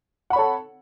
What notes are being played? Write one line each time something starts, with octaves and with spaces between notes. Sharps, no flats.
A4 C#5 F#5 B5